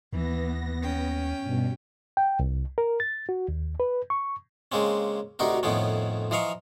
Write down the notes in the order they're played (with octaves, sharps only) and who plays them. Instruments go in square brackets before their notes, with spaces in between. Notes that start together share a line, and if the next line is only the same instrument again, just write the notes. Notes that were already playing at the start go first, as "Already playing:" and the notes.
[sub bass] D#2 [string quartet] E3 [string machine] B3 A#6
[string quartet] C#4 G5
[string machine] G2 B2
[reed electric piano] G5
C2
A#4
A6
F#4
D#2
B4
C#6
[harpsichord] C#3 G#3 A#3 C4 C#4
D2 C3 D#4 F#4 A#4
F2 A2 D#3 F3 B3 C#4
E3 F3 D#5 F5 A#5 C#6